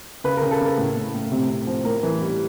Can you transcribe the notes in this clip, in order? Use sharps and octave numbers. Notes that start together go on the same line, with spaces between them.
C#3 B4
C#3 A#4
A4
C#3 A#4
A2
A2
A2
C3
C3
F3
A2 A#4
E3
G3